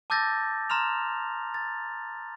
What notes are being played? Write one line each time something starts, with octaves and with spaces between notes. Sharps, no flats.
A5 D6 E6 G6 A6 A#6
A#5 C6 F6 F7
A6